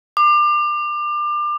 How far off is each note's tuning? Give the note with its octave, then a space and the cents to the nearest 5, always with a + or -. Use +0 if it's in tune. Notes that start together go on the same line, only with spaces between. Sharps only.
D6 +30